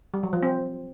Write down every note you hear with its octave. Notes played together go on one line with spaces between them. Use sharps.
G3
F#3
F3
C4